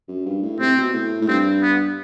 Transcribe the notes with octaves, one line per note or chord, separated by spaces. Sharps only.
F#2
G2
A2
C3 C4
B2
A2
A2
G2 C4
B3